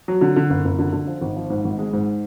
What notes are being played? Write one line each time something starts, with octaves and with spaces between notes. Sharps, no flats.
F#3
D3
D3
F#1
F#1
D3
D3
F3
G#1
F3
G#2
G#1
G#3
G#2